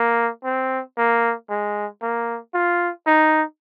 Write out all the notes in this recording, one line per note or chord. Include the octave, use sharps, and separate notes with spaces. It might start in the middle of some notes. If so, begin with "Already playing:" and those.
Already playing: A#3
C4
A#3
G#3
A#3
F4
D#4